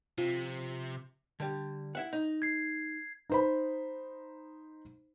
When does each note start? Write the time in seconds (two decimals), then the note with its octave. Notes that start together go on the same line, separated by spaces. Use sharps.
0.18 C3 F3
1.40 D3 G3
1.95 E4 E5 F#5
2.13 D#4
2.42 G#6 C7
3.30 D#4 C5 B5